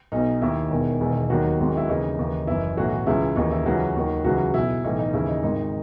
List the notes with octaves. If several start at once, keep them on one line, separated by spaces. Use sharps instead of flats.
B1 B2 D#4
D#2 D#3 E4
E1 E2 D#3
E1 E2 D#3
D#2 D#3 F#3 F#4
G#1 G#2 D#3
E4
D#2 C#3 E3 D#4
D#2 C#3 E3
F#1 F#2 E3 E4
B1 A2 E3 F#3 F#4
C#2 C#3 E3 E4
D#2 C#3 E3 D#4
E4
C#2 C#3 E3 F#3 F#4
D#2 D#3
C#2 C#3 E3 F#3 F#4
B1 B2 E4
B1 A2 E3 D#4
D#4
D#2 C#3 E3 E4
D#4
G#1 G#2 D#3 D#4